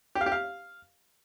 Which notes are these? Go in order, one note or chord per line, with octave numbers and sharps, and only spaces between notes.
G4
F5
G4
F5